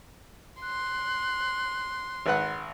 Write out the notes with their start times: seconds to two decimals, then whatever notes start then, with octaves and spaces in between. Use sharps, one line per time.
0.62 C6 F#6
2.26 G#1 B4 F#5